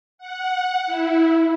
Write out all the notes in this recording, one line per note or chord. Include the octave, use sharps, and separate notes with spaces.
F#5
E4